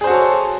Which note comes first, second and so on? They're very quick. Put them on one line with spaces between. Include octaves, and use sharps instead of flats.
G#4 C5 F#4 A4 C#5